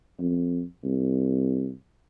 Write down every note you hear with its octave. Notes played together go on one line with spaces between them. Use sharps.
F2
C2